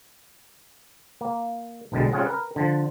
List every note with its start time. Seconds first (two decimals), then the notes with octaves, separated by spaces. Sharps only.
1.21 A#3
1.92 B1 B2 D3 G3 G#3
2.12 G3 C4 C#4 F4 G#4 F#5
2.26 A#4 B4
2.56 D3 F3